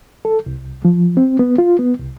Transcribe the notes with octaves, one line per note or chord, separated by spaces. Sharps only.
A4
C2
F3
C4
B3
F4
B3
C2